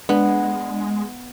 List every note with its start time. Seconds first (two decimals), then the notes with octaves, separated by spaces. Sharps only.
0.09 G#3 B3 D4